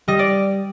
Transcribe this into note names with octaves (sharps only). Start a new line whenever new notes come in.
G3 D#5
D5